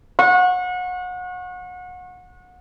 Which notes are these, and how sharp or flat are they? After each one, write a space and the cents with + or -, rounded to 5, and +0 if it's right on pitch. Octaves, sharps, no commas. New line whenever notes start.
F#5 -30 C#6 -30